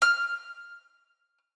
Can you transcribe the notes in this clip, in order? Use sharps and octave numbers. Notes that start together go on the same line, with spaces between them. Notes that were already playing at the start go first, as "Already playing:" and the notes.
F6